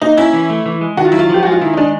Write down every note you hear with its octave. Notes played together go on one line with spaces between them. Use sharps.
A#3 D#4
C#4 E4
E3
A3
E3
G#3
D#3 F#4
F4
F#3 E4
F4
F3 G4
G#3 F#4
F4
D#3 E4
D#4
G#3 D4